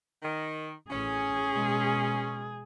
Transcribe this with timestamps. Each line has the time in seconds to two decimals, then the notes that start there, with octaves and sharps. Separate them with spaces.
0.22 D#3
0.91 A1 C#4 G#4
1.51 B2 G#3